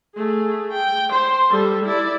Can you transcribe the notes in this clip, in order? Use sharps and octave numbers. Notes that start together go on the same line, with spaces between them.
A3 G#4
G5
C5
G3 A4
E4 D5